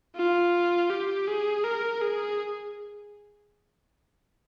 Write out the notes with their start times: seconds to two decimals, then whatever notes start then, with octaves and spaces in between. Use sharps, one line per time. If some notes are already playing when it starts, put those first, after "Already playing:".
0.16 F4
0.90 G4
1.27 G#4
1.64 A#4
2.02 G#4